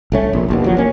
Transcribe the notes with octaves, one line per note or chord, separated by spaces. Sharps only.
C2 A3 C#4
A#1
A#1 D#2 B2
F1 F3 F#3
A#3 C#4